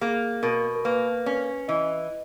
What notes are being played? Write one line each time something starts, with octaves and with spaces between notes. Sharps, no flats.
A#3 G#4
B2 A#4
A#4
A#3 B4
C#4 B4
E3 D#5